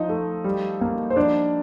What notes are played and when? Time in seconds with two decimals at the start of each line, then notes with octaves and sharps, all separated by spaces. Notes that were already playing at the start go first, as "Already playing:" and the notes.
Already playing: F3 D#4 D#5
0.09 A3
0.44 G3
0.81 A#3
1.10 C5
1.16 F3 D4 D5